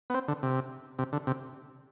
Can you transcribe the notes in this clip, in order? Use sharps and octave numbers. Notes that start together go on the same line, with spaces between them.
B3
C4
D3
C3
C3
D3
C3